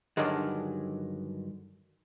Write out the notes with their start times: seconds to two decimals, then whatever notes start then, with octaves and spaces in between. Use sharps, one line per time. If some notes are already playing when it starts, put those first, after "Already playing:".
0.17 G2 D3 D#3 F#3 G#3